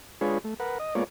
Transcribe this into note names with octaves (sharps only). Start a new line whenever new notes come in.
G#3 D4 F4 G#4 B4 C#5
A3
A#4 B4 F#5
D#5
G#3 A#3 B3 F4 C#5 D5